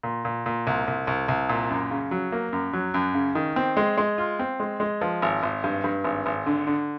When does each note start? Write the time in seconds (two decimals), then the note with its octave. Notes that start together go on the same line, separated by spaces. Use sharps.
0.03 A#2
0.25 A#2
0.46 A#2
0.67 C2
0.88 C2
1.07 C2
1.28 C2
1.49 A#2
1.70 F#2
1.91 C#3
2.11 F#3
2.32 A#3
2.53 F#2
2.73 F#3
2.94 F#2
3.14 C#3
3.35 D#3
3.56 C4
3.77 G#3
3.98 G#3
4.18 F4
4.39 C4
4.60 G#3
4.80 G#3
5.01 F3
5.22 G#1
5.43 G#1
5.64 G2
5.84 G2
6.04 G#1
6.26 G#1
6.46 D3
6.67 D3